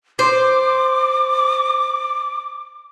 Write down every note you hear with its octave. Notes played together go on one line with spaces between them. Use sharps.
C5 D6